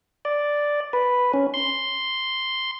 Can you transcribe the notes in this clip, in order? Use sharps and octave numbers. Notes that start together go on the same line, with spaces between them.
D5
B4
C#4
C6